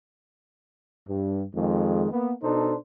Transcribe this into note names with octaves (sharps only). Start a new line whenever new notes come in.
G2
F2 D#3 G#3
A#3 B3
B2 D4 D#4 A4 C5